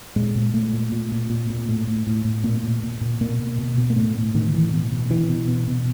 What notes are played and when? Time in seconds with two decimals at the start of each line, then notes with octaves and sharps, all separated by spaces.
0.16 A#2 G#3
0.36 A#2
0.54 A#2 A3
0.73 A#2
0.92 A#2
1.12 A#2
1.30 A#2
1.50 A#2
1.69 A2
1.87 A2
2.07 A2
2.25 A2
2.44 A#2 A#3
2.64 A#2
2.83 A#2
3.01 A#2
3.21 B2 A#3
3.39 B2
3.59 B2
3.77 B2
3.90 A#3
3.96 A2 A3
4.15 A2
4.34 A2 D#3
4.48 D#3
4.54 A2 E3
4.73 B2
4.92 B2
5.10 B2 E3
5.29 B2
5.48 B2
5.67 B2